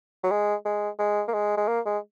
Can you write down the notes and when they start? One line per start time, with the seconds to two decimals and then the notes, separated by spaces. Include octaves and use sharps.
0.23 F#3
0.31 G#3
0.65 G#3
0.99 G#3
1.28 A#3
1.34 G#3
1.57 G#3
1.68 A#3
1.86 G#3